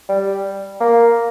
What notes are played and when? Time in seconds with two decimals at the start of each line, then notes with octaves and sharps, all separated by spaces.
0.09 G3
0.80 A#3